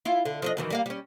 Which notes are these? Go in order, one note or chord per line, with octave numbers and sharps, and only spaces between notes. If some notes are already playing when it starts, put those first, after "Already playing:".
E4 F4
D3
F3 D4 D#5
F#2 D#3 E3
G3 A#3 F5
G3 C#4